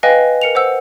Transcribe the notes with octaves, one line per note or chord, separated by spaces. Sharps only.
B4 D#5 F5 G5 G#5
A#4 C#7 F7
C5 F#5 E6